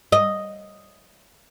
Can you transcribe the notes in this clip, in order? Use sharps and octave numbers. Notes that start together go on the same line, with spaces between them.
D#5